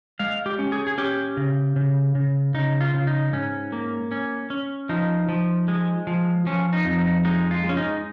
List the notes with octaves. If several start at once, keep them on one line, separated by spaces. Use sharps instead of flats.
G#3 F5
G4
C#4
G#4
G#4
C#4 G4
C#3
C#3
C#3
C#3 D#4
F4
C#3
D#4
G#2 C#4
A#3
C#4
C#4
F3 D#4
F3
G#3
F3
F3 C#4
D#4
F2
D#4
G#3 D#4
F4
G#3
C#4
D#4